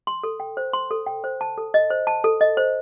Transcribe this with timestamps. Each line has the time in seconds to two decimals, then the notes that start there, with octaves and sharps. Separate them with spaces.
0.07 C6
0.23 A4
0.40 G5
0.57 C5
0.73 C6
0.91 A4
1.07 G5
1.24 C5
1.41 A5
1.58 A4
1.74 D#5
1.90 C5
2.07 A5
2.24 A4
2.41 D#5
2.57 C5